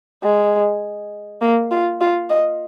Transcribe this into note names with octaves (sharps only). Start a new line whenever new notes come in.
G#3
A#3
F4
F4
D#5